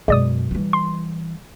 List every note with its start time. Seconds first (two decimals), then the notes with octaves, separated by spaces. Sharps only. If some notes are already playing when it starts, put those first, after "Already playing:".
0.08 F#2 B2 G#3 D5 D#6
0.51 E3 G3
0.73 C6